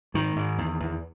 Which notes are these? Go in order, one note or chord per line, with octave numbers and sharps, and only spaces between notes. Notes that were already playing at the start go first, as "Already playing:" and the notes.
G#2 D#3
G#2
E2
E2